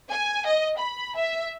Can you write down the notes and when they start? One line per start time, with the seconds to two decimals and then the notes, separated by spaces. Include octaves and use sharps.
0.12 G#5
0.47 D#5
0.80 B5
1.17 E5